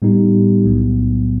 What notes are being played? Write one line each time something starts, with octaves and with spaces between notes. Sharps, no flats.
A2 G3 B3 D#4 G4
B1 A2 F#3 B3